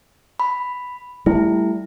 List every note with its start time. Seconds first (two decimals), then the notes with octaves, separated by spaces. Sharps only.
0.40 B5
1.26 G3 A3 E4